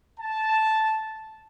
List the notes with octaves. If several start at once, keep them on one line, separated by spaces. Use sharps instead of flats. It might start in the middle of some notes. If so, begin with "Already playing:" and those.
A5